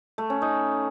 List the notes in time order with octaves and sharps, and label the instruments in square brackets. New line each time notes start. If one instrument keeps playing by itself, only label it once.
[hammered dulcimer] A3
C#4
D#4